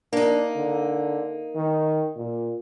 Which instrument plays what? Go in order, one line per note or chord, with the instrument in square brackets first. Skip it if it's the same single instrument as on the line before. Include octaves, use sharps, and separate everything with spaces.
[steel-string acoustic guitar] A#3 D#4 [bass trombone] D4
[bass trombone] D3
D#3
A#2